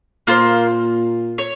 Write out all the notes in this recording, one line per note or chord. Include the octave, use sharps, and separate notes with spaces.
A#2 A#3 F4 C5
C#5